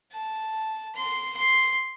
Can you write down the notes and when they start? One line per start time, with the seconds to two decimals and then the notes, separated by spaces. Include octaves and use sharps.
0.12 A5
0.95 C6
1.37 C6